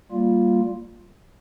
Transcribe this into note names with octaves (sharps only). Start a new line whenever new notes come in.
G3 A#3 F4